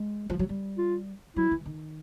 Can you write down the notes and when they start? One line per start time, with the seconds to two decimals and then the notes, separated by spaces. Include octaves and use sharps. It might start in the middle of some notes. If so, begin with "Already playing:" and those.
Already playing: G#3
0.30 F3
0.39 F#3
0.49 G3
0.78 F4
1.36 F#3 E4
1.51 E3
1.65 D#3